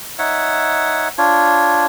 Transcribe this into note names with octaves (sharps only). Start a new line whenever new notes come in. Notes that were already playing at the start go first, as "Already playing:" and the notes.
D#4 C#5 E5 F#5
D4 F4 C#5